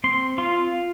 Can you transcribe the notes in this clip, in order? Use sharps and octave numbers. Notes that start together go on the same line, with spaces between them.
C4 C6
F4 C6